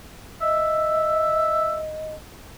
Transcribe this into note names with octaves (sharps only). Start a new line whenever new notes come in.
D#5 E5